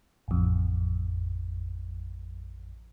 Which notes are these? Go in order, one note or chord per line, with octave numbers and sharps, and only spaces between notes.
A1 F2